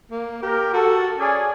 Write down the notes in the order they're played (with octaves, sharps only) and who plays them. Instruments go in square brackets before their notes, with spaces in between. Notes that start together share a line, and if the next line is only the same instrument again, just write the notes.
[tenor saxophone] A#3
[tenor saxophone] G4 [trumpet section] A#4
[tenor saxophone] F#4 [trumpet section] A4
[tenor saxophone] C#4 [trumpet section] G#4 D5 G#5